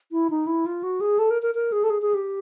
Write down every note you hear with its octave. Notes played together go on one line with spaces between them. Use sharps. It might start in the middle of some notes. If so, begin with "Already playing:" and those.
E4
D#4
E4
F4
F#4
G#4
A4
A#4
A#4
A#4
G#4
A4
G#4
G#4
G4